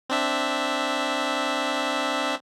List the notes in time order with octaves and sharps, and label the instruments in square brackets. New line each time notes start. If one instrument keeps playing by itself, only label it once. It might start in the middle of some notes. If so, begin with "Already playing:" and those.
[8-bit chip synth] C4 D4 E5